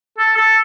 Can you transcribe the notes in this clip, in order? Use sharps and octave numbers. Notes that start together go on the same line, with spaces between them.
A4
A4